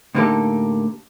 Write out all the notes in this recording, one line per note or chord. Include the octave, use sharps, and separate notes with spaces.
A2 D3 A#3 D#4 G4 A4